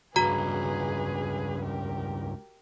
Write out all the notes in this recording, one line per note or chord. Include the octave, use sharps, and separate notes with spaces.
C#2 G2 F#4 G#4 B4 A#5
G4 A#4